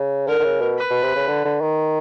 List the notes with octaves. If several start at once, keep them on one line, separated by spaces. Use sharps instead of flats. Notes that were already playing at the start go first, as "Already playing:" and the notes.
Already playing: C#3
D3 A#4
D3
C#3
B2
B4
B2
C3
C#3
D3
D3
D#3